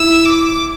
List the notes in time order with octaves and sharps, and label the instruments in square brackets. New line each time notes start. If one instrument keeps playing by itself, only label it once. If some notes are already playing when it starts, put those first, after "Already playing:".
Already playing: [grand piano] E4 [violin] E6
[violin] D6